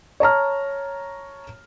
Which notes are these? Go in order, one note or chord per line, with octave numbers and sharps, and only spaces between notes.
C#5 A5 A#5 F6